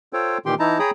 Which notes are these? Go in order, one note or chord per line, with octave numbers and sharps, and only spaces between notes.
F4 A4 C5 C#5 G5
A#2 D#3 E3 G4 G5 C6
E3 D#4 E4 A5 A#5
G#4 C#5 G5 A#5 B5 D#6